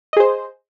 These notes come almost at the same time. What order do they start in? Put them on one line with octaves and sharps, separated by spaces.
D#5 G#4 C5